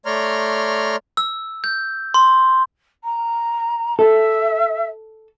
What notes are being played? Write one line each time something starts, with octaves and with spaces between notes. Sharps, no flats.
A3 C#5 D5 A#5 C6 F6
E6
G6
C6
A#5
A4 E5